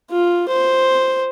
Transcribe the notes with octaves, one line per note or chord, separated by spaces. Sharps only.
F4
C5